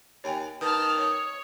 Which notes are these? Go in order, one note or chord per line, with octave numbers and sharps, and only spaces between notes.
D#2 C#5 G5 G#5
D#3 B4 A5 D#6 F6
C#5